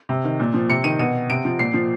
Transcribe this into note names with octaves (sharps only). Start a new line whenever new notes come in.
C3
D#3
A#2
F3
C3 C#7
D#3 D#7
B2 D#7
C3 D7
F3
A#2 C7
F3